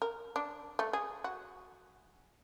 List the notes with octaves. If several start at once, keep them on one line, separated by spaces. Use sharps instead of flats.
A#4
D4
A3
G#4
F#4